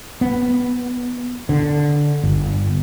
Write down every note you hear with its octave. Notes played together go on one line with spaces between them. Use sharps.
B3
D3
G1